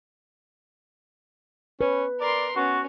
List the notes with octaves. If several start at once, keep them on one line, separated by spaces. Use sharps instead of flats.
C#4 B4
A#4 D5 C6
B3 C#4 F#4